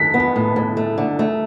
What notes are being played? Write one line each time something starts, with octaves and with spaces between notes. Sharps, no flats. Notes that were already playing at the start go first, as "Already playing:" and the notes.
Already playing: B6
B3
A2
A2
A3
D3
A3